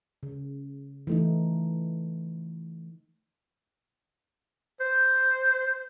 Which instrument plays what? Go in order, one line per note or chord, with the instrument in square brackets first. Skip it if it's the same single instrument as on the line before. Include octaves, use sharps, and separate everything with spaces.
[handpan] C#3
E3 A3 D#4
[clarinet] C5